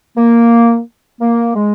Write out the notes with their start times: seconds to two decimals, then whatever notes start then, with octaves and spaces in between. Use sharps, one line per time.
0.17 A#3
1.21 A#3
1.56 G#3